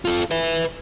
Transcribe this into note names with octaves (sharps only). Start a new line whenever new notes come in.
F4 A4
B4 E5